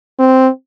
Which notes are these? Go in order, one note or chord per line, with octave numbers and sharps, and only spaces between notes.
C4